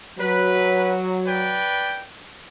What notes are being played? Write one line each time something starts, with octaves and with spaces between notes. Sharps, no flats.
F#3 B4
B4 D5 G5